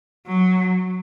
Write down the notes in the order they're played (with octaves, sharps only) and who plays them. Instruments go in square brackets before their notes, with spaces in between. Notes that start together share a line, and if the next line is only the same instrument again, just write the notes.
[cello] F#3